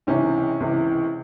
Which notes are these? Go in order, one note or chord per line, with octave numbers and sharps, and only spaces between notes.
C#2 C3 E3 C#4
C#2 C3 E3